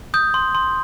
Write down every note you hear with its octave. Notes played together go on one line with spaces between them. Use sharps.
D#6 G6
C6
C6